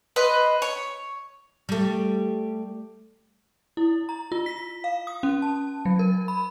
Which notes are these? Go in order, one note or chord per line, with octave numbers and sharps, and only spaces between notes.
B4 C5 D#5
C#5 C#6
G3 A3
E4
A#5
F4
B6
F5
D#6
C#4
A5
F#3
A#4
B5